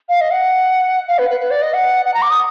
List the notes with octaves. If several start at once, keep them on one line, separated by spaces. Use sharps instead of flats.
F5
D#5
F#5
F5
B4
B4
B4
D5
D#5
F#5
F#5
A#5
D6
D#6